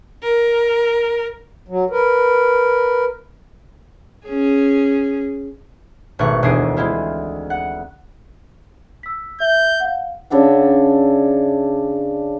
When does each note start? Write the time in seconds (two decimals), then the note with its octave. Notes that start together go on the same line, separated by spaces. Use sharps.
0.23 A#4
1.68 F#3
1.90 A#4 B4
4.27 C#4 G#4
6.19 G#1 B2 A3 C#6 F#6
6.43 E1 D2 G#4 D#6 C7 D7
6.77 G#3 C4 E4 F4
7.50 F#5
9.03 E6 B6
9.40 E5 G6
9.80 F5 F#5
10.30 C#3 D4 E5 F#5